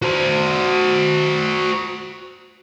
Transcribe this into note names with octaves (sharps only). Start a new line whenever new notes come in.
F#4 C5